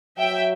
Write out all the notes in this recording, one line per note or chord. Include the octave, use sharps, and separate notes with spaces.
F#3 E5 G5